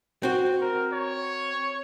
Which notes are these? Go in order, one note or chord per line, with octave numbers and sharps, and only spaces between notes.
C4 F#4
A#4
C#5